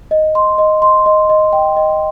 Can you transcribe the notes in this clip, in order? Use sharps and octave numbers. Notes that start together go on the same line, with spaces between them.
D#5
C6
D#5
C6
D#5
D#5
G5
D#5